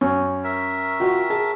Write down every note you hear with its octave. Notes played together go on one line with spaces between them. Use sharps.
F#2 C#4
A#4 E5
F4 F#4 G5
G#4 A5